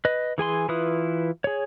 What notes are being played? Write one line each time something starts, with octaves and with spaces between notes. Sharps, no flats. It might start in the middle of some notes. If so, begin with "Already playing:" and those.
B4 D#5
E3 G#4 G#5 C6
E3 E4 F4 B4 D#6
G#4 C#5